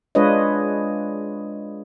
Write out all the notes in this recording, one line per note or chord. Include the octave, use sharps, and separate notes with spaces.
G#3 D4 F4 B4 C#5 D#5